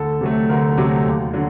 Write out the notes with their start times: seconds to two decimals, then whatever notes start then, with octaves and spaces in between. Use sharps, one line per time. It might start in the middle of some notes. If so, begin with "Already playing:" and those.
Already playing: D2 A4
0.21 C3 F#3 A3
0.49 D2 A#4
0.78 C3 F#3 A3
1.05 D#2
1.33 D3 F#3